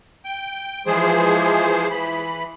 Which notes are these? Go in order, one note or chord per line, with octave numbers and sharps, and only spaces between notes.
G5
E3 F3 G#3 G#4 C5
E3 B5